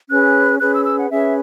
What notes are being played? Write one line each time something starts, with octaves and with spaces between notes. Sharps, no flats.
C#4 G#4 B4 F#6
C#4 G#4 B4 F#6
E6
E6
F#5
C#4 G#4 B4 E5